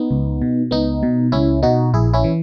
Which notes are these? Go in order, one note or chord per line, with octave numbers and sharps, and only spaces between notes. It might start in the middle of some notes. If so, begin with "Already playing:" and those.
Already playing: B3 D#4
C#2
B2
C#2 B3 D#4
B2
C#2 C#4 E4
B2 D#4 F#4
A#1 E4 G#4
C#4 E4
E3